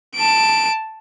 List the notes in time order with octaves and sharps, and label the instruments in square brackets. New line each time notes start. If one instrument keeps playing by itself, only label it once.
[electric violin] A5 D7